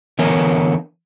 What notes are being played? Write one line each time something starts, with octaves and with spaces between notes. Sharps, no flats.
D3 E3 B3 A#4 C#5 G#5